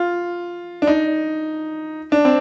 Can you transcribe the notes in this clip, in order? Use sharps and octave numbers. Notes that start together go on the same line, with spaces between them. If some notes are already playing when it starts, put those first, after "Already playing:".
Already playing: F4
D4
D#4
D4
C4